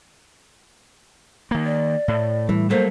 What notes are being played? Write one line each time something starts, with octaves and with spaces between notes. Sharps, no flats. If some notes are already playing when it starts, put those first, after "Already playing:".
D#3 A#3
D5
A2
E3 G3
F#3 A3 A#3 C5